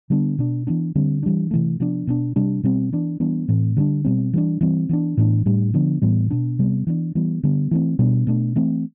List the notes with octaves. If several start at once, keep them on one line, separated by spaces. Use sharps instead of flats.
D3 G3 B3 D4
B2 B3 D4
E3 B3 D4
D3 G3 C4
E3 G3 D4
C3 E3 A3
C3 F3 B3 D4
B2 B3 D4
C3 G3 D4
B2 G3 C4
E3 B3 D4
E3 G3 B3 D4
A2 E3 A3 C4
D3 G3 B3 D4
B2 G3 C4
E3 G3 B3 D4
E3 G3 C4
E3 B3 D4
A2 E3 B3 D4
A2 G3 D4
D3 F3 B3 D4
A2 E3 G3 B3
B2 B3 D4
C3 G3 B3
E3 B3 D4
E3 G3 B3
D3 G3 B3
E3 A3 C4
B2 G3 B3 D4
B2 A3 D4
E3 A3 C4